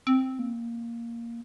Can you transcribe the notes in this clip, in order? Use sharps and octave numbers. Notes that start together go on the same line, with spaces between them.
C4
A#3